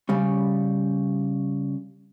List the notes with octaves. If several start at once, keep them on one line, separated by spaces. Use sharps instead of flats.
C#3 G3 C#4